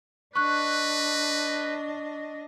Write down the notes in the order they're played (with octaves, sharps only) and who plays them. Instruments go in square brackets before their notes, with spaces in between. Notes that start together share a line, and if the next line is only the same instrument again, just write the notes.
[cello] D4 D#5 [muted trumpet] B4 [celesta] C#6 F#6